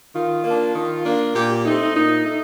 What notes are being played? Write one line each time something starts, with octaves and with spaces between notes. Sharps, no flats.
D#3 F4
A#3 D4
D#3
A#3 D4
A#2 G4
G4
A3 C4 D#4
D#4
A#2 D#4
A3 D#4